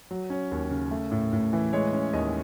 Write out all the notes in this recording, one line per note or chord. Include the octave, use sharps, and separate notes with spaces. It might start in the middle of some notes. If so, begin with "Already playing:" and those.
F#3
C#4
D#2
C#3
A3
A2
A2
E3
G#3 C#5
C#4
D#2 D#5